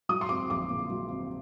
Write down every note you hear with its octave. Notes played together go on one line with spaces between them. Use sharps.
F#3 D#6
C6
C4 D6
A#1 D6
A#2
F#3
C4